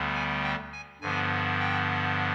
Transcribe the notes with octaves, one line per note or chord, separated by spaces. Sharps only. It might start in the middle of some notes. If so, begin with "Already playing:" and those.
Already playing: D2 D3 G3 B3
G#5
G5
G#5
G2 D3 F3 B3 G#5
G5